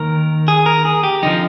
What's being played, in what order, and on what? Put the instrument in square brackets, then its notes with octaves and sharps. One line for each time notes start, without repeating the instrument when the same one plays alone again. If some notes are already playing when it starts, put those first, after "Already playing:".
Already playing: [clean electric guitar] D#2 D#3 A#4
G#4
A#4
G#4
G4
F2 D3 F3 D#4